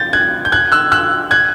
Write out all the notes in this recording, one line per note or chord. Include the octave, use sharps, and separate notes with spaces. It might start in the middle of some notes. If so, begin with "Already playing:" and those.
Already playing: G6 A6
F#6 G#6
G6
F#6 G#6
E6 F#6
E6 F#6
F#6 G#6